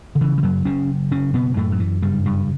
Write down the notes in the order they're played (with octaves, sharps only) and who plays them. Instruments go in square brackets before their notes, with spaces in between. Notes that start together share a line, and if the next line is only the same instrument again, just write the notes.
[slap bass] D3
C#3 E3
E3
F#2 F#3
F#1 C#3 C#4
F#1 C#3 C#4
B2 B3
F#2 A2 A3
F#3
E3
G2 C#3 G3
G2 G3